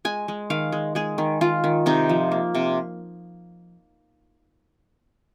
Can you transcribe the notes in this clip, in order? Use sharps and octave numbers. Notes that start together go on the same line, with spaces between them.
G#3 G#5
G#3
D#3 F5
G#3
G#3 G#4
D#3
D#3 F4
D#3
C3 D#4
F3
A#3
C3